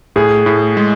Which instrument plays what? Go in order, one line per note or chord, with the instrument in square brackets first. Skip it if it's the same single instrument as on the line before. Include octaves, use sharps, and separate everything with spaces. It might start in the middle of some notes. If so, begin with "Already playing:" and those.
[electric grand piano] A2 [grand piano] G#4
[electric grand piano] A2
G#3